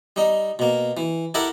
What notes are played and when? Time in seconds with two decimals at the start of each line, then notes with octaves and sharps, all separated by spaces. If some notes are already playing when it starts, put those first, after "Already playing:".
0.16 G3 D#4
0.59 B2 A#3
0.97 E3
1.34 E4 G4 A4 A#4 E5 F#5